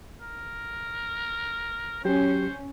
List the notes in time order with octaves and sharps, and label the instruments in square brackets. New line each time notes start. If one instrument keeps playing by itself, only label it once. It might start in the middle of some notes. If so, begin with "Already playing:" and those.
[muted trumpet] A#4
[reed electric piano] F#3 G4 [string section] C#4 [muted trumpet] C5